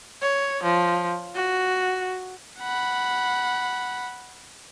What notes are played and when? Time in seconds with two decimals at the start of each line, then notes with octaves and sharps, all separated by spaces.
0.22 C#5
0.64 F3
1.35 F#4
2.59 F#5 B5